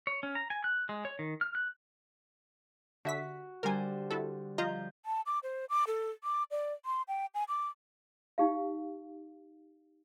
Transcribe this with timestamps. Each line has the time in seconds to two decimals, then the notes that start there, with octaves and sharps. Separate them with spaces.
0.07 C#5
0.23 C#4
0.35 A#5
0.50 G#5
0.64 F#6
0.89 G#3
1.05 C#5
1.19 D#3
1.41 F6
1.55 F#6
3.05 D3 F#4 E5 B6
3.63 D3 G3 A#4 C5 G#5
4.11 E4 F#4 A4
4.58 F3 F4 D#5 A#5 G6
5.05 A5
5.26 D6
5.43 C5
5.70 D6
5.87 A4
6.24 D6
6.51 D5
6.85 C6
7.08 G5
7.34 G#5
7.48 D6
8.38 D#4 G4 F5